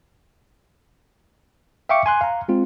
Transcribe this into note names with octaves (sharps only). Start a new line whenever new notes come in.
E5 F5 G5 C#6 D6 C#7
G#5 C6 F#6
F5 A#5
G#3 C4 F4